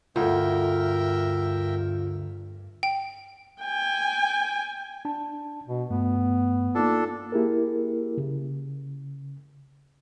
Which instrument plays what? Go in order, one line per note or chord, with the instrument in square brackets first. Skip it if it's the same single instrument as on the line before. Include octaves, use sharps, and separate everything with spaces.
[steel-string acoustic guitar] D2 [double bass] G2 [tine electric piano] F4 [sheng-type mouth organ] A#4 E5 G5
[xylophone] G5
[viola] G5 G#5
[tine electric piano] D4 A5
[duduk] B2
[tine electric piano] G2 A3 [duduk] B3
[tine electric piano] A#3 D#4 F4 [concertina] D4 A4
[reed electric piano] A#3 E4 G4 G#4 A#4
C#3